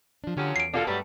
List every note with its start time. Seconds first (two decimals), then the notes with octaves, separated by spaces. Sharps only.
0.24 F3 D4
0.37 D3 F3 F#3 C#4 G4
0.56 E2 C7 D7
0.73 B2 D3 A#3 D4 F4 A4
0.87 G2 F#3 G3 A3 B4 G5